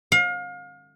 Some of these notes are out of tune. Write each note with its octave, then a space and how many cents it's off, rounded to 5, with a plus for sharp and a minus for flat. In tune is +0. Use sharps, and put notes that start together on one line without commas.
F5 +35